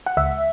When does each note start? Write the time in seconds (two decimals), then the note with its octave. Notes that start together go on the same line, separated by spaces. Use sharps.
0.06 F#5
0.17 C#2 E5